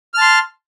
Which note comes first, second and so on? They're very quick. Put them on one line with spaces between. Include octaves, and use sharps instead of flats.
F6 A5 C6